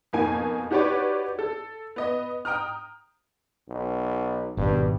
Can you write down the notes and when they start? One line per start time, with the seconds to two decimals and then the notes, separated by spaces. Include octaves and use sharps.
0.13 F2 B2 A#3 D#4 G#5
0.71 D#4 F#4 G4 B4 C#5 D5
1.39 A4
1.96 B3 D#5
2.45 G5 A#5 D#6 F6
3.69 B1
4.57 G#1 G2 B2